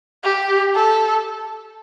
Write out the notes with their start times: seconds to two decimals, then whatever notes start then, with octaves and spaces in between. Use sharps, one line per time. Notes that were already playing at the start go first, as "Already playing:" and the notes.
0.24 G4
0.76 A4